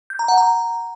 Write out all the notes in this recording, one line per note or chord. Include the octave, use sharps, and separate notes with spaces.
G6
A#5
F#5
A#5